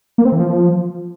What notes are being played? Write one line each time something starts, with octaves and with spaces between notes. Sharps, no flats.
A#3
C4
E3
F3